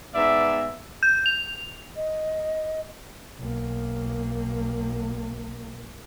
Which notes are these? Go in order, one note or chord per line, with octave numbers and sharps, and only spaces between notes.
G#2 B3 D5 E5
G6
F7
D#5
B1 A#3